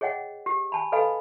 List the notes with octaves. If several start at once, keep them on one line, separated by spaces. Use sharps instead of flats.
G#4 C#5 D#5 F#5 G5
G4
G#5 A5 B5
A4 B4 D#5 F5 G#5 B5